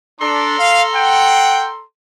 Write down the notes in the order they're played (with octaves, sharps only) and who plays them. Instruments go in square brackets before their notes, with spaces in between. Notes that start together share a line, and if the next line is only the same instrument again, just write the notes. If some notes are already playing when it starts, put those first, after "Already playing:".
[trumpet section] D4 [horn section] A4 A#5 C6
[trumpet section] F5
F#5 G5